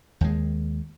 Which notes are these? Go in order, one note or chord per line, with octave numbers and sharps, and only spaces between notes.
D#2 G#3